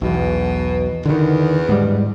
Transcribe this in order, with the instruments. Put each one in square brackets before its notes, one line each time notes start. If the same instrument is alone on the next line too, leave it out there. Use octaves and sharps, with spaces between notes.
[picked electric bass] B1 E2 [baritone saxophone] B2
[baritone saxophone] E2 [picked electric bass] D3 D#3
[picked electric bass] G#2 G3